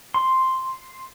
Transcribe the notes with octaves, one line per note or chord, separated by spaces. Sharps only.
C6